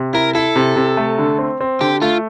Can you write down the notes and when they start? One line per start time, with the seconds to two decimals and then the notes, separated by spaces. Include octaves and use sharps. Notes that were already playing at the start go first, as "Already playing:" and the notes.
Already playing: C3
0.13 E4 A#4
0.35 E4 A4
0.56 C3
0.76 C3
0.97 A3
1.19 D3
1.39 C4
1.61 C4
1.81 D3 G4
2.02 A3 F4